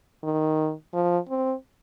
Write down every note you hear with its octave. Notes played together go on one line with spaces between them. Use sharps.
D#3
F3
C4